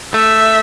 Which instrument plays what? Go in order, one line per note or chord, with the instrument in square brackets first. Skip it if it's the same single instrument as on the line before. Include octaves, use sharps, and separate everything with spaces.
[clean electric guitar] A3 [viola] E5